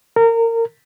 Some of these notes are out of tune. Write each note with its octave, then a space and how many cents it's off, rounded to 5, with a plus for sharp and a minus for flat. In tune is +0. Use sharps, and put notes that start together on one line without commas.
A#4 -25